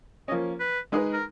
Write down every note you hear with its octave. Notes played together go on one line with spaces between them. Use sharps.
F3 A#3 C#4 D#5
B4
G#3 D#4 G#4 B4
A#4